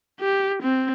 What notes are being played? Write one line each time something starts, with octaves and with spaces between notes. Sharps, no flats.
G4
C4